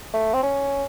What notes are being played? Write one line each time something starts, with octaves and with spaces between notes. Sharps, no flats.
A3
C4
C#4